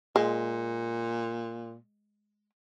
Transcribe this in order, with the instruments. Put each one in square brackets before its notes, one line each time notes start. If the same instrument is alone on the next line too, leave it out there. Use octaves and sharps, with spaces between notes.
[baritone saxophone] A#2 [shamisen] G#3